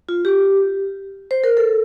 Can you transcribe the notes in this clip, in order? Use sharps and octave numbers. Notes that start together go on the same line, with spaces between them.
F4
G4
C5
A#4
A4